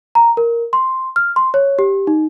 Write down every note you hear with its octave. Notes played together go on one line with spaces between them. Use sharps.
A#5
A#4
C6
F6
C6
C#5
G4
D#4